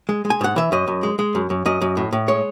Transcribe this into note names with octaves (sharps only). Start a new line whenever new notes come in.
G#3
G#3
G#5
G#2 F#5
E3 E5
F#2 D#5
F#2
G#3
G#3
F#2
F#2
F#2 D#5
F#2
A2
A2
G#3 C#5